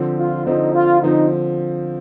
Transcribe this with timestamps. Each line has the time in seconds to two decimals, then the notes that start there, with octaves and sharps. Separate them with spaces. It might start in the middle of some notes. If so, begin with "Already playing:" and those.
Already playing: D3 F3 C4
0.18 F4
0.46 D3 F3 C4 D#4
0.74 F4
1.01 D3 F3 C4 D#4